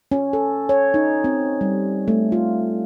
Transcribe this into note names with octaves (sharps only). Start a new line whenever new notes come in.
C#4
A4
C#5
D#4
C4
G3
A3
F4